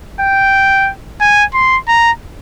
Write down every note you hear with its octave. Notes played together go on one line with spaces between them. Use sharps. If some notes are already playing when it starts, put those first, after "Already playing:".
G5
G#5
C6
A#5